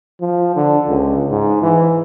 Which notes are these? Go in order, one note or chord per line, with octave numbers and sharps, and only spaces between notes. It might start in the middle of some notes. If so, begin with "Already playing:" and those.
F3
D3
C#2
G#2
E3